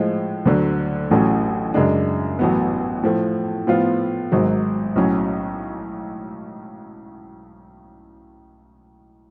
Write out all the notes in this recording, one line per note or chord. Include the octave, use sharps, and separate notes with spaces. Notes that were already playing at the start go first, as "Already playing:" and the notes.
Already playing: A2 F3 G#3
D2 D3 F#3
A1 A2 F#3 A3 C#4
F#2 C#3 G#3 D4
A1 A2 F#3 B3
A2 F3 A3
A2 F3 B3 F4
G#1 G#2 F#3
B1 A2 F#3 C#4